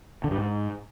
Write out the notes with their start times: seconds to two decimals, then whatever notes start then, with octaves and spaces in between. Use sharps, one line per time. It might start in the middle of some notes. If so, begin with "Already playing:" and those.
0.24 D3
0.31 G2
0.38 G#2